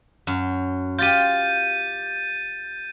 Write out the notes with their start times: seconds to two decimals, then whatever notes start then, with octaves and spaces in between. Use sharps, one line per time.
0.27 F#2
0.99 F4 G4 G6 A6 D#7